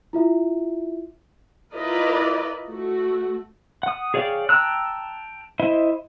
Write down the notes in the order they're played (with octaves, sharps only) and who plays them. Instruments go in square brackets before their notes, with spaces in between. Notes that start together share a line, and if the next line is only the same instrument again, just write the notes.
[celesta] E4 F4 E5
[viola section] E4 F4 A#4 B4 D5 D#5
A3 F#4
[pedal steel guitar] F#5 D#6
G#4 C#5 D5 F5 G5
G5 A5 A#5 E6 F#6
E4 C5 D#5 E5